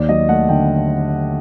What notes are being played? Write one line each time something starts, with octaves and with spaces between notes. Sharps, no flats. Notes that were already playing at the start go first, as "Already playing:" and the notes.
Already playing: D#2 D#3 D5
F#3 D#5
A3 F#5
D3 G5